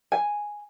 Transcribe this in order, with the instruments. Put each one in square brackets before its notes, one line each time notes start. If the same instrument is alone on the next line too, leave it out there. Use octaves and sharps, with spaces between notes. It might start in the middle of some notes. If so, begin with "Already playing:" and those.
[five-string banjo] G#5